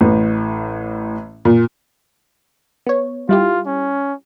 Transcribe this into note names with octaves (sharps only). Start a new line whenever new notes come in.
A1 A2
A#2
B3 C#5
G3 E4 F4 G4
C#4